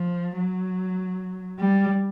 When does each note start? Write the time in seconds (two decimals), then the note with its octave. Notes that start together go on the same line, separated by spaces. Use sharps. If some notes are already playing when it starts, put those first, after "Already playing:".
Already playing: F3
0.39 F#3
1.59 G3